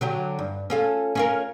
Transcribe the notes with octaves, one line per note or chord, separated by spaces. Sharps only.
D3 F#3 G4
G2
C#4 F4 A4
C#4 F4 A#4